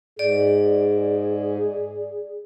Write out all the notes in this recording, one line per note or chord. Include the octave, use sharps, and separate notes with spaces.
G#2 G#4 D5